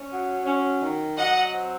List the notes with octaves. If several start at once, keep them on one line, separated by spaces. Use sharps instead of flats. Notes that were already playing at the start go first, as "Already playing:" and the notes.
Already playing: C#4
F#3
C#4
D#3
F#3 D#5 F#5
C4